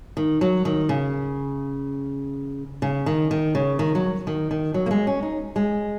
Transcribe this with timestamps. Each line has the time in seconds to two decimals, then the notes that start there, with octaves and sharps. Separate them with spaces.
0.17 D#3
0.41 F#3
0.65 D#3
0.89 C#3
2.82 C#3
3.06 D#3
3.31 D#3
3.55 C#3
3.79 D#3
3.95 F#3
4.27 D#3
4.51 D#3
4.74 F#3
4.86 A#3
4.91 G#3
5.07 C#4
5.23 D#4
5.56 G#3